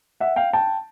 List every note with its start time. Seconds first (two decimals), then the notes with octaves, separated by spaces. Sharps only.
0.20 E5 F#5
0.36 F5 G5
0.53 G5 A5